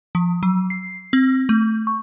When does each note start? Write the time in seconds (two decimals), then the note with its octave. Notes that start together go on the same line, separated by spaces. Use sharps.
0.15 F3
0.43 F#3
0.70 C7
1.13 C4
1.49 A3
1.87 C#6